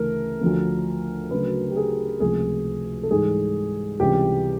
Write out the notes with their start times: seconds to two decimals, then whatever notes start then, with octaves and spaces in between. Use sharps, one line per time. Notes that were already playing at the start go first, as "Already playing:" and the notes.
Already playing: D2 C#3 E3 A3 A#4
0.41 D2 D3 F3 A3
1.31 D2 C#3 F#3 A3 B4
1.70 G4
1.76 G#4
2.20 C#2 C3 F3 A3 G#4
3.03 A4
3.10 G#2 E3 G3 G#4
4.00 C#2 C3 E3 G3 G4